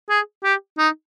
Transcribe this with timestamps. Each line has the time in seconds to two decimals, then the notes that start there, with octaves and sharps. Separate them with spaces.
0.10 G#4
0.44 G4
0.78 D#4